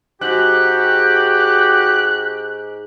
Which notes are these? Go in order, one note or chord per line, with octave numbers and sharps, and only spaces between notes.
G#2 F#4 G4 F#6